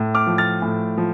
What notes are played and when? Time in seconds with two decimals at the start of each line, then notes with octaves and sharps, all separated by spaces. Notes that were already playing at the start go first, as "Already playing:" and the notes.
Already playing: A2
0.15 D6 F6
0.27 F3
0.38 F6 A6
0.62 A2
0.98 F3